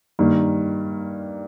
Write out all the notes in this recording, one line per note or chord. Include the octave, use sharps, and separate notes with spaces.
G2 D#3 A#3